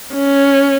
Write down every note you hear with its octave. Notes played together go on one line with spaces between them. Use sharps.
C#4